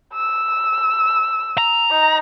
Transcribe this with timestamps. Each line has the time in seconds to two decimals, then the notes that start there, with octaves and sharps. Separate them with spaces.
0.14 E6
1.58 A#5
1.91 D#4